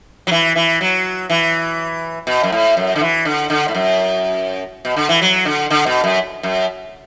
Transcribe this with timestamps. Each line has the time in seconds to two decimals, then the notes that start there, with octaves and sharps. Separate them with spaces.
0.27 F#3
0.31 E3
0.56 E3
0.81 F#3
1.30 E3
2.27 B2
2.43 F#2
2.52 A2
2.77 F#2
2.96 D3
3.01 E3
3.25 D3
3.50 D3
3.68 A2
3.75 F#2
4.85 B2
4.96 D3
5.09 E3
5.22 F#3
5.45 D3
5.70 D3
5.86 B2
6.04 F#2
6.43 F#2